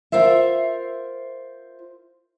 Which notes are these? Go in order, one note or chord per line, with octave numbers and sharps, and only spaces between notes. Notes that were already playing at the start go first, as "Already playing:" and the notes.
F4 A#4 C5 E5